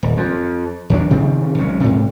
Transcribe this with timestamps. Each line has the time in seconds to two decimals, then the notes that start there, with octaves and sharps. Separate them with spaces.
0.03 D#1
0.17 F2
0.90 D#2 F#3 D4
1.10 C3 D#3 F3 C4
1.58 C2 F#3 G#3 C#4
1.80 G#2 C3